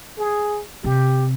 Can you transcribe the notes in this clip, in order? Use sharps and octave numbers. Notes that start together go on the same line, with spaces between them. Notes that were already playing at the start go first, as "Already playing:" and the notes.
G#4
C3 G4